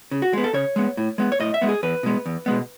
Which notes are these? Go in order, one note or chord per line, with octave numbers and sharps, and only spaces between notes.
C#3
F#4
G#3 B3
A4
C#3 C#5
G#3 B3
A2
G#3 B3
C#5
A2 D#5
E5
G#3 B3
G#4
E2 B4
B2 G#3 B3
E2
B2 G#3 B3